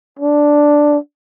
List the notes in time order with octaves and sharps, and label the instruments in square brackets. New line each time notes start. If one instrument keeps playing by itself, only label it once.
[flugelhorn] D4